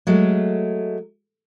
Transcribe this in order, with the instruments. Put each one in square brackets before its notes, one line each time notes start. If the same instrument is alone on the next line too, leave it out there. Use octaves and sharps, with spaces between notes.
[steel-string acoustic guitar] F#3 G#3 A3